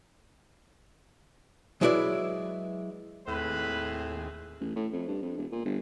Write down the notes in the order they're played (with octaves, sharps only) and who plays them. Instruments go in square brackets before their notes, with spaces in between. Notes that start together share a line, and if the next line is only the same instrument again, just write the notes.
[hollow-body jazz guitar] F#3 G#3 E4 B4 D5 E5
[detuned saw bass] D#2 [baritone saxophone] A2 [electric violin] C4 G#4 [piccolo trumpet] B4
[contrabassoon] A1
A2
F2
G2
F2
E1
A#2
G1